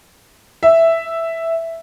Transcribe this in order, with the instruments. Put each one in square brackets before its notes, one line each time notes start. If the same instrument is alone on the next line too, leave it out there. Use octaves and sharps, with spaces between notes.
[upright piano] E5